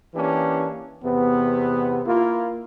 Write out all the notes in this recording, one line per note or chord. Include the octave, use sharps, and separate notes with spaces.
E3 A#3 C#4 D4 G4
E2 C3 B3
A#3 E4 F4